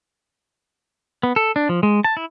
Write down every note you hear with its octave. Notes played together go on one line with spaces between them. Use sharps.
B3
A4
D4
F3
G#3
A5
E4